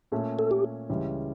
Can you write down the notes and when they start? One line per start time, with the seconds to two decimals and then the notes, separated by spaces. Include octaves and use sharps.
0.12 A#2 A3 C#4
0.39 A4
0.51 G4
0.89 C#2 C#3 E3 G3 C#4